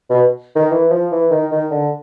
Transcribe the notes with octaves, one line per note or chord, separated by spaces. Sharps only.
B2
D#3
E3
F3
E3
D#3
D#3
D3